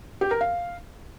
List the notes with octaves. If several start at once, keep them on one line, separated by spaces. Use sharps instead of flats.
G4
A#4
F5